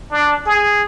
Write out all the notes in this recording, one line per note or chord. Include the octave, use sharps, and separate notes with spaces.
D4
G#4